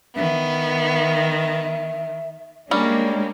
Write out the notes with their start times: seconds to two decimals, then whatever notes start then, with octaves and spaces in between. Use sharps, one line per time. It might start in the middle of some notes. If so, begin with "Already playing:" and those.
0.16 D#3 B3 E5
2.71 G3 G#3 A#3 C#4 D4